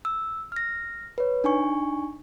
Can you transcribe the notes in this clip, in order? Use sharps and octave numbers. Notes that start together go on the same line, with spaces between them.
E6
F6 A#6
B4 C#5
D4 D#4 G#5 C#6